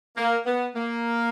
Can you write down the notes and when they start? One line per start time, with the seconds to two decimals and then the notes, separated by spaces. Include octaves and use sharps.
0.17 A#3
0.46 B3
0.76 A#3